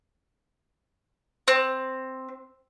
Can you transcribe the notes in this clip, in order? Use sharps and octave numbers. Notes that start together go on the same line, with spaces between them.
C4